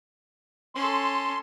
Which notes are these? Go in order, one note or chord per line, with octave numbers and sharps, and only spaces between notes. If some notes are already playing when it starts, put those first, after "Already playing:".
C#4 A4 C6